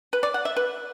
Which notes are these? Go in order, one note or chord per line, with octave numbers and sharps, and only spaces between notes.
B4
D5
F#5
E5
B4